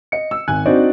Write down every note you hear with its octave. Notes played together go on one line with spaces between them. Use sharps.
D#5 C#7
E6
G#1 G#5 F#6
C4 D4 D#4 F#4 C5 D5